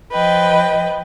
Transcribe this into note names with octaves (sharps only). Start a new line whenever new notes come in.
F3 B4 D#5 G5